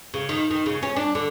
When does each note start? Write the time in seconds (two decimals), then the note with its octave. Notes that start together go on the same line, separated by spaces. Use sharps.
0.14 C#3
0.29 D#3
0.51 D#3
0.66 C#3
0.83 C#4
0.96 D4
1.15 D3